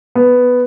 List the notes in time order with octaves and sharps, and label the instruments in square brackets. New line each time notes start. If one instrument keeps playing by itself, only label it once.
[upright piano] B3